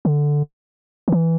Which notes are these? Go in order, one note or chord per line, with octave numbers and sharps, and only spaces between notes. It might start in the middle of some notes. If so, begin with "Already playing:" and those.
D3
D#3
E3